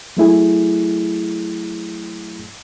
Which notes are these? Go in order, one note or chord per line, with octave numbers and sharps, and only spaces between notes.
F#3 A3 E4 G#4